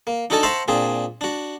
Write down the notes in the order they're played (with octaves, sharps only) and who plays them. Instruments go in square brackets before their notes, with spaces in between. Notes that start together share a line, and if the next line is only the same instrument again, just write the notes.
[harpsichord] A#3
D4 D#4 F#4 A4 G#5 A5
C5 E5 F#5 A5 A#5 C#6
A#2 C4 D4 G#4
D4 F#4